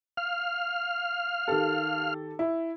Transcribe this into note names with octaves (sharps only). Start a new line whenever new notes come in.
F5 F6
D#3 G4 A4
E4